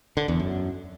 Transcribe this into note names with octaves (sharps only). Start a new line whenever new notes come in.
D3
E2
F#2